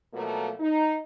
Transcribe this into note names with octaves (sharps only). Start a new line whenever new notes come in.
B2 F3 F#3 A3 A#3
D#4